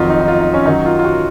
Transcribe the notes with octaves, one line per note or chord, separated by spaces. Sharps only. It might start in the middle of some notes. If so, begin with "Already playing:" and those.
Already playing: F2 D#3 F#3 F4
D#4
D#4
F4
D#4
C#4
F#2 D#3 F#3 D#4
F4
F4
F#4